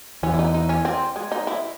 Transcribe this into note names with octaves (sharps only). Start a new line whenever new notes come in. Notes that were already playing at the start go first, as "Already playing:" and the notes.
E2 E3 C#4
E4
D#4
D#4
C#4
C4
G#3
D#4
E4